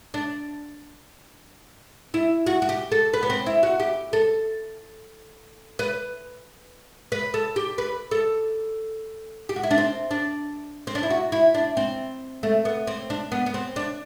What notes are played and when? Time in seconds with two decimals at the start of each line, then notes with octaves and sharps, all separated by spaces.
0.14 D4
2.14 E4
2.46 F#4
2.62 F#4
2.69 G4
2.92 A4
3.14 B4
3.23 B3
3.30 C4
3.46 E4
3.63 F#4
3.80 G4
4.13 A4
5.79 B4
7.12 B4
7.34 A4
7.56 G4
7.78 B4
8.11 A4
9.49 G4
9.56 F#4
9.63 E4
9.71 D4
9.78 C4
10.11 D4
10.87 C4
10.95 D4
11.03 E4
11.10 F#4
11.32 E4
11.55 D4
11.77 C4
12.43 A3
12.65 B3
12.87 C4
13.10 D4
13.32 B3
13.46 B3
13.54 C4
13.76 D4